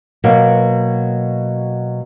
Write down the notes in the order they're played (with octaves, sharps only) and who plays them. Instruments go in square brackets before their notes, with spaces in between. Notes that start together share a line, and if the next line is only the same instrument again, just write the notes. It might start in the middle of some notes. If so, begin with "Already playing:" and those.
[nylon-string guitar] B2 F#3 A#3